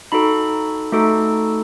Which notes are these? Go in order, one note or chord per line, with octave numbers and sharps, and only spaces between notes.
D#4 F#4 A4 B5
A3 D#4 F#4 A4